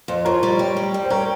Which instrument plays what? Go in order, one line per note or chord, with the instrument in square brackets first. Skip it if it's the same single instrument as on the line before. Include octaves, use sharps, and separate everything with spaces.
[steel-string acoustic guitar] F2
[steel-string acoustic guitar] F3 [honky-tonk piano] A#4 C#5
[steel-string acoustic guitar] G3
G4
G3
G3
[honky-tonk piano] C5
[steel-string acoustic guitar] G4 [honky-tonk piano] A#4 C#5